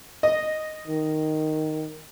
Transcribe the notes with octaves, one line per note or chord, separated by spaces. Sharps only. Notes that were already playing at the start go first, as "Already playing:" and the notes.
D#5
D#3